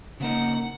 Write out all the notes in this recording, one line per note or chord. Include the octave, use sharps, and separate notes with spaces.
C#3 F#3 A#3 D#4 A#4 F#5